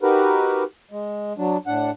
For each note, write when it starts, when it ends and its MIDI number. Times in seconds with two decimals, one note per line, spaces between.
0.03 0.64 63
0.03 0.64 66
0.03 0.64 67
0.03 0.64 70
0.03 0.64 71
0.91 1.33 56
1.38 1.57 54
1.38 1.57 62
1.67 1.91 45
1.67 1.91 62
1.67 1.91 78